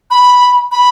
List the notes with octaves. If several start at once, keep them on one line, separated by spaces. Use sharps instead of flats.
B5
B5